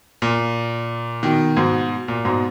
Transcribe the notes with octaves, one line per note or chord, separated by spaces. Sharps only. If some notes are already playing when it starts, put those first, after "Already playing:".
A#2
B2 D#3
G#2 B2
A#2
G#2 B2